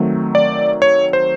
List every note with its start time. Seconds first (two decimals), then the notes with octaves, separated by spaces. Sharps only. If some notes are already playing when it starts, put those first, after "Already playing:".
Already playing: D#3 F#3 A3 C4
0.35 D5
0.82 C#5
1.13 C5